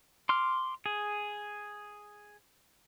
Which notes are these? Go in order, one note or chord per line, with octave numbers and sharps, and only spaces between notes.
C6 D6 F6
G#4